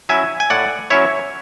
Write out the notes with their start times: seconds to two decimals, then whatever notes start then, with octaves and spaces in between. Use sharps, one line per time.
0.09 F#3 C#4 E4 E5 G#5
0.40 G#5
0.50 A2 D5 F#5
0.90 F#3 C#4 E4 C#5 E5